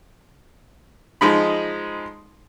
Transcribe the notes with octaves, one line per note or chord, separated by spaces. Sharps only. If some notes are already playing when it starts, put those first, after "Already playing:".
F3 G#3 D#4 B5